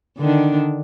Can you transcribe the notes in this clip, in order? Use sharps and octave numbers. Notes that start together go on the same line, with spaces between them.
D3 D#3 D4